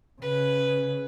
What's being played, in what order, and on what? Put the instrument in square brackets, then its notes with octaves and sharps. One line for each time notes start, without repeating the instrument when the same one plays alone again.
[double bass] C#3 [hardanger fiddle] B4